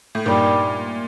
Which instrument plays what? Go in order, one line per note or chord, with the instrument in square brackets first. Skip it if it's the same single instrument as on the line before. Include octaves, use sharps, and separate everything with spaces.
[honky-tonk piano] A2
[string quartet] G2 D#3 G3 [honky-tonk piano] A#2